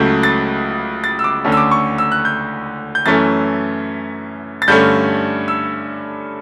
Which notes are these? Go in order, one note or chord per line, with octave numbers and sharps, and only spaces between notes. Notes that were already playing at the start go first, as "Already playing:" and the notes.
Already playing: C#2 C#3 F#3 A3 G6
A6
A6
E6
D6
D2 D3 A3 C#4
E6
D6
C#6
E6
F#6
G6
G6
F#2 E3 A3 C#4 A6
A6
G2 D3 A3 C#4 G6
E6